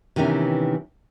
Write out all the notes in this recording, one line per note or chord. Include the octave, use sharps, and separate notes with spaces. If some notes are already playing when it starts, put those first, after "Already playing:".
C3 D#3 E3 B3 C#4